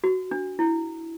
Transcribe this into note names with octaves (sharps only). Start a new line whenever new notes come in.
F#4
D4
E4